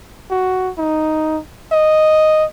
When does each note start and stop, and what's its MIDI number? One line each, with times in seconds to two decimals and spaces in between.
0.31 0.71 66
0.78 1.39 63
1.72 2.45 75